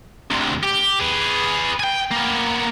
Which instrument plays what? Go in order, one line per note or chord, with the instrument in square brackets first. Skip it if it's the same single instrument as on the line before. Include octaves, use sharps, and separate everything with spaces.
[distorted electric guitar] D2 C3
G4
G#4 B4
G5 G#5
A#3 B3